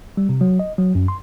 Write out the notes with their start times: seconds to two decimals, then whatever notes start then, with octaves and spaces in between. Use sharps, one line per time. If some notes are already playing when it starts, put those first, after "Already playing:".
0.17 G3
0.29 C3
0.41 F#3
0.59 D#5
0.78 F#3
0.95 F#2
1.08 C6